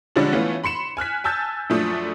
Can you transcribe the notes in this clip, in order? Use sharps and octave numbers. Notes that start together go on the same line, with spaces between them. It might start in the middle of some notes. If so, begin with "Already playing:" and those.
D3 F3 G3 G#3 C#4 D4
E3 A3 B3 C#4 F4
B5 C6 C#7 E7
G#5 F6 F#6 B6
G#5 A5 E6 G6 A6
F#2 F3 A3 D4 D#6